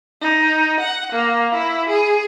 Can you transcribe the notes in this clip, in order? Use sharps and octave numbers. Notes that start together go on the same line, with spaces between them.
D#4
F#5
A#3
E4
G#4